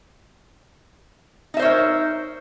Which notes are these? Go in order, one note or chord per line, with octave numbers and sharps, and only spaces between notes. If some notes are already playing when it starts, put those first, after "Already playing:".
D#4 A#4 C5 C#5 E5